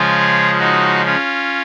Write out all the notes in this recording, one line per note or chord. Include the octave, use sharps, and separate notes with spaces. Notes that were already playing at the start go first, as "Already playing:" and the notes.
Already playing: C#3 F3 G#3 F4 G#4
D#4 F#4
C#4 F4